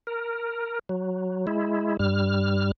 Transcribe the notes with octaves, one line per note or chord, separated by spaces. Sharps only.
A#4
F#3
G#3 E4
G2 G3 F6